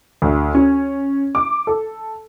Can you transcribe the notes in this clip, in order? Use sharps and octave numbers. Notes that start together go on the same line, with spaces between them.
D2
C#4
D6
A4